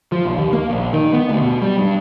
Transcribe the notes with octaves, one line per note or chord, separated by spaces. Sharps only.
F3
B1
D#2
A#3
A#1
D#3
B3
D2
B2
G3
G2